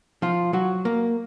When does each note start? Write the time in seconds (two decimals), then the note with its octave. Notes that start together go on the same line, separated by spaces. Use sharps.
0.22 F3 F4
0.53 F#3 F#4
0.85 A#3